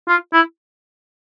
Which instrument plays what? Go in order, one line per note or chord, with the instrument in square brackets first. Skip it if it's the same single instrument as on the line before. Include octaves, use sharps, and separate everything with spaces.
[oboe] F4
E4